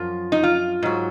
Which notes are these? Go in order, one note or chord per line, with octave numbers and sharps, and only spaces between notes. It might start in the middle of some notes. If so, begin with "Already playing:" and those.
Already playing: F#2 F3 F4
D#4
F4
G#2 F#3